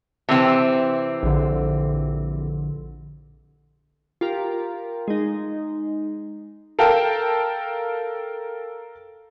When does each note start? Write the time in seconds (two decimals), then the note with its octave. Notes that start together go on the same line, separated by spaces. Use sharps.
0.29 C3 E3 C4
1.23 A#1 D3
4.21 F4 G4 A#4
5.08 G#3 D#4
6.79 A4 A#4 F5 G5 A5